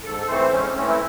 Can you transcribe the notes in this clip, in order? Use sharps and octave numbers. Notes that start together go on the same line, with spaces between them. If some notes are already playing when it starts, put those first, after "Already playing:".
G#2 A4
E3 A3 C4 C5
G#2 C#4
C4
E3 A3 C4 C#4
E4